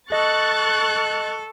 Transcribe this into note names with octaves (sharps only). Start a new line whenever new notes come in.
A4 D#5 C#6 F#6 A6